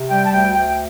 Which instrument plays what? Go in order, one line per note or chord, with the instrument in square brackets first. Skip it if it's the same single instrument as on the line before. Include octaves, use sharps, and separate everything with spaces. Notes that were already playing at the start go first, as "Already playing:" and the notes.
Already playing: [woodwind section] C3
G3 G5
A5
D2 G5
D2 G5